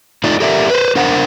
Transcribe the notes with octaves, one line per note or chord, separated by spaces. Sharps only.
A3 D#4 F4 D5
G4 A4 A#4 D5 E5
B4 C5
D4 A#4 C5 F#5